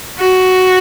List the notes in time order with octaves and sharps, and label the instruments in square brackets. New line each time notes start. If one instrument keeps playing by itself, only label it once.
[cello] F#4